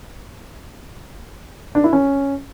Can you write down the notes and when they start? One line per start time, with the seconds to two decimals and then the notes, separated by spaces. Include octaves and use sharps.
1.75 D4
1.84 E4
1.93 C#4